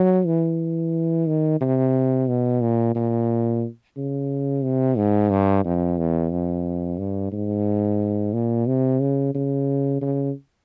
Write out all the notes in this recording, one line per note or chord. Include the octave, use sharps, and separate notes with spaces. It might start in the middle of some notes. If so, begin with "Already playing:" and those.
Already playing: F#3
E3
D#3
C3
B2
A#2
A#2
C#3
C3
G#2
G2
F2
E2
F2
G2
G#2
A#2
C3
C#3
C#3
C#3